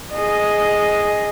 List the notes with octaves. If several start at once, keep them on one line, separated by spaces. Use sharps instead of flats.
G#4 D#5